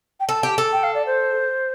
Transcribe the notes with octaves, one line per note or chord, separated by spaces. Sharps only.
G5
A4 A5
G4
A4
G5
F5
D5
C5